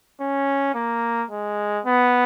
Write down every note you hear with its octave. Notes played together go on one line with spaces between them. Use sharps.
C#4
A#3
G#3
B3